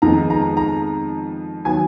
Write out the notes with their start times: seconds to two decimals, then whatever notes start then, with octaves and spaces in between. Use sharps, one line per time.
0.02 F2 D#3 G#3 B3 D#4 A#5
0.30 A#5
0.57 A#5
1.65 D#3 F#3 B3 G#5